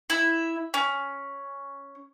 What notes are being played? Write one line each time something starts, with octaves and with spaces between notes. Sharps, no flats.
E4 E5
C#4